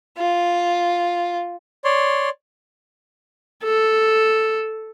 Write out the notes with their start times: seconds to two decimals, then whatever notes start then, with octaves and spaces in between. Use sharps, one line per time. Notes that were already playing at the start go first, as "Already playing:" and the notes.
0.18 F4
1.85 C#5 D5 C6
3.63 A4